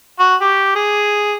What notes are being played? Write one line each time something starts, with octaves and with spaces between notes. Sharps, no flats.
F#4
G4
G#4